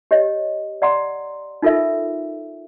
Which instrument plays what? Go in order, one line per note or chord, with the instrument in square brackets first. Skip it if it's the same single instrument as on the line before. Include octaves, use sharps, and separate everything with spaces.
[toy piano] G4 C#5 D#5
D5 F#5 A#5 C6
D#4 F4 A4 A#4 E5